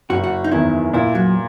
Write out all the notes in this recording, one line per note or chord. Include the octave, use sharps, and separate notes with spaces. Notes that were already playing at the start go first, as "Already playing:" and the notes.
F#1 F#4
F#4
D#4
E2 D#3 E4
A#2 E4
F#3